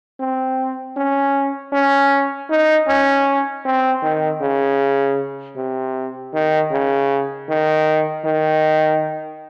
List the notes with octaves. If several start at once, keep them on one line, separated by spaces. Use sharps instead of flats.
C4
C#4
C#4
D#4
C#4
C4
D#3
C#3
C3
D#3
C#3
D#3
D#3